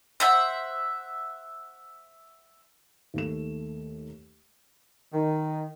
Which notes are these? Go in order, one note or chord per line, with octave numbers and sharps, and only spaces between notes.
C5 E5 F#5
D#2 A3 E7
D#3